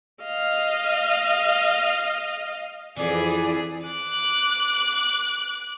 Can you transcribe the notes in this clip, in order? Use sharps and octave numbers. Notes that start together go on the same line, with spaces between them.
D#5 F5
F2 E3 G#4 D5
D6 F#6